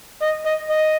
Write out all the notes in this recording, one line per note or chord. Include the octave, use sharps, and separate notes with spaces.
D#5
D#5
D#5